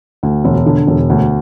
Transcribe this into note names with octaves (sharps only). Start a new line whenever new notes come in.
D2
E1
D3
E1
D2